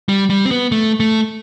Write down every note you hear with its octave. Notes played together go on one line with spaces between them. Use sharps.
G3
G3
C4
B3
A3
A3